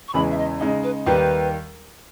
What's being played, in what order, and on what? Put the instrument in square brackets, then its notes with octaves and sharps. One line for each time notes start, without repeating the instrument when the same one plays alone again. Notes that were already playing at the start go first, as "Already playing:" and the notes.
[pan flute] C#6
[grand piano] E2 C#3 E3 G#3 [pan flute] B5
[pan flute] E5
D#5
[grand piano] C#3 G#3 D#4 [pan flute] D#5
[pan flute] B4
[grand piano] D#2 D#3 G3 [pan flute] B4